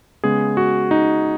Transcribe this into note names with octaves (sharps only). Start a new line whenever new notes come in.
C#3 G#3 B3 G#4
F#4
D#4